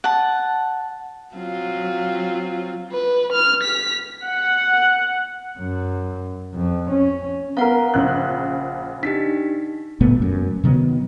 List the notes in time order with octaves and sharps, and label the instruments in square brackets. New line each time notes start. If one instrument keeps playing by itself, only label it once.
[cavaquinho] F#5 A5
[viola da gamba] F#3 C4 F4
[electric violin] B4
F6
B6
[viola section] F#5
[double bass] F#2
F2
C#4
[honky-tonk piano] B3 A#4 [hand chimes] F5 F#5
[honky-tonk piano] A#1 C#3 F#6
[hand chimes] D4 D#4 G4 [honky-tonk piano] B6
[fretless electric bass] F#1 A#2 A3 B3
F#2
C3 D#3 F#3 B3